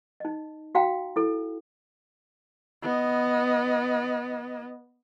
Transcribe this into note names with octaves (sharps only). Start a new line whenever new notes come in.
D#4 D#5
F#4 F5 G5 A#5
E4 A4
B3 D#5